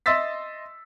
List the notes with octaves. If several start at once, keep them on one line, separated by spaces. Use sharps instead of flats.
D#5 E5 C6 E6 A6 B6